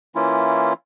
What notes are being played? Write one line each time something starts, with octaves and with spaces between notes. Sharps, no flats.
E3 A#3 C#4 E4 F4